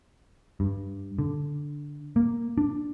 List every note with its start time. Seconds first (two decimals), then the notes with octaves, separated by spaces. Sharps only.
0.60 G2
1.19 D3
2.16 A#3
2.58 D4